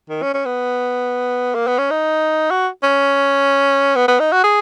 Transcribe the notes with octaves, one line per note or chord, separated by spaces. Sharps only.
D#3
C#4
C#4
B3
A#3
B3
C#4
D#4
F#4
C#4
B3
B3
D#4
F#4
G#4